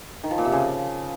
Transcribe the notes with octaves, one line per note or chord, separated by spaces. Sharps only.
D#3
F3
A#2
C3
C#3